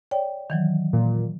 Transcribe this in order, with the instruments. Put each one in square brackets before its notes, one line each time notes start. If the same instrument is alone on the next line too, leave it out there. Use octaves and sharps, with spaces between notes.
[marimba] C#5 D5 G5
D#3 E3 F#3
[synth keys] A#2